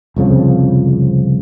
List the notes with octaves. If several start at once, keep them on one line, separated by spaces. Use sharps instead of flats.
C2 F2 C#3 F3